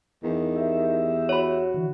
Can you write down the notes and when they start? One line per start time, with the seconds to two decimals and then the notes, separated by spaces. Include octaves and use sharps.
0.23 E2 D#3
0.56 G4 E5
1.29 F#4 C#5 B5
1.74 D3 E3